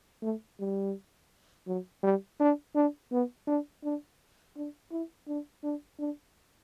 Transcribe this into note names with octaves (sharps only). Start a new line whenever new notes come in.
A3
G3
F#3
G3
D4
D4
B3
D4
D4
D4
E4
D4
D4
D4